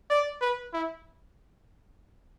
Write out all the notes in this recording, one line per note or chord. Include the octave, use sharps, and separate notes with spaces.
D5
B4
E4